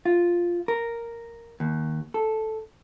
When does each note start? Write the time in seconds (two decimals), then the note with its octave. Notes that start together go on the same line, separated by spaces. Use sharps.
0.05 F4
0.68 A#4
1.60 D#2
2.14 A4